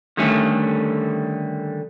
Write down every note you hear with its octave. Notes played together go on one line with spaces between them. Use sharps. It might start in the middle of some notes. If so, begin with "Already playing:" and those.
D3 D#3 G3 A3 C#4